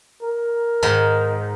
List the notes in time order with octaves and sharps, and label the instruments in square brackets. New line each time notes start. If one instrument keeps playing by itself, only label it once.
[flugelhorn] A#4
[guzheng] G#2 D#3